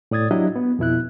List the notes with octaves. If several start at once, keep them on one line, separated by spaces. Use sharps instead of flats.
A2 D5 D#6 G#6 A6
F#3 D4 E4 G4 D#5
B3
F2 B2 E4 F#6